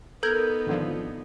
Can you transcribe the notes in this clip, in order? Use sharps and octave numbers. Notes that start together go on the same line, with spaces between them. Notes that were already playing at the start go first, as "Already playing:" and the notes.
B3 D#4 A4 A#4 G6 G#6
G#1 D3 F3